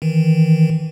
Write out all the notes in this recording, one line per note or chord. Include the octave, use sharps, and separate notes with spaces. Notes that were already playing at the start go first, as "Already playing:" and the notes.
D#3 E3